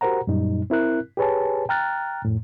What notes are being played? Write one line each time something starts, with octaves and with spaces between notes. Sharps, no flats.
F#4 G4 A#4 C5 F#5 A#5
F#2 A#2 G3 D#4
C4 E4 A#4 F#6
G4 G#4 B4 C#5 G#5 A5
G5 A#5 F6 F#6 A6
F2 A2